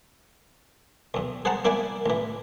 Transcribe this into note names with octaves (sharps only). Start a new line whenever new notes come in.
B1 E2
G#4 C5 F#5 A5 A#5
A#3 E4 D5 G#5 D6
A1 E3